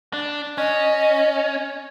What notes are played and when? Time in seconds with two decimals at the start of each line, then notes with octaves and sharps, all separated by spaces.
0.13 D4
0.58 C#4 D#5